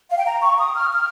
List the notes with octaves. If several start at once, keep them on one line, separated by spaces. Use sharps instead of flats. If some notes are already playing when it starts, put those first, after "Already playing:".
F5
G5
A#5
C#6
D#6
F6
F6